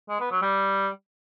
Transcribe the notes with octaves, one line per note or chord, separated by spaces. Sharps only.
G#3
B3
F#3
G3